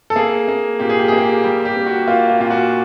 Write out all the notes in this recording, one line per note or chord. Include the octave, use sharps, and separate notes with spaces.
A4
A#3 G#4
A#3
A#2 G4
G#4
G4
A#3 G#4
G4
G3 G4
G4
A#3
F#4
A#3 F4
F4
A#2 F4
F#4